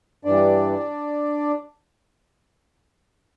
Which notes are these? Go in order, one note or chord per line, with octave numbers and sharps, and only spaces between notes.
G2 E3 G3 D4 D5